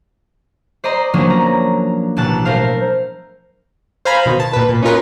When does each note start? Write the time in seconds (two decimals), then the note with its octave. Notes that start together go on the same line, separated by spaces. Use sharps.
0.84 C5 D5 D#5 A#5 C6
1.14 F3 F#3 A#3 B3 C#4 D4
1.30 A#5
2.16 A1 B2 A5 F#6 A6
2.45 A3 B3 A#4 C5 F5
4.05 C5 F5 G#5 A#5 B5
4.26 B2 D#3
4.40 A5
4.53 A#2 B4
4.69 A#2
4.82 C#4 D#4 F4 A#4 B4